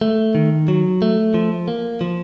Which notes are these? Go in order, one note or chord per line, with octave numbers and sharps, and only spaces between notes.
A3
D#3
F#3
A3
F3
A#3
F3